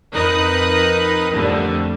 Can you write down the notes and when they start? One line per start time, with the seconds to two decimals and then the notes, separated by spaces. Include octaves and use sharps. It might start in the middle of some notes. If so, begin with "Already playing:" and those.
0.12 F2 D#4 A#4 B4 D#6 F#6
1.34 F2 D3 G3 A3